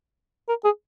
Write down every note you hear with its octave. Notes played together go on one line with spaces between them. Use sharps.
A#4
G#4